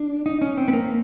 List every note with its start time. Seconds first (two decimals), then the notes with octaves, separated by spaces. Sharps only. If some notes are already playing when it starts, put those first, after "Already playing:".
Already playing: D4
0.26 D#4
0.41 C#4
0.57 C4
0.68 B3
0.73 A#3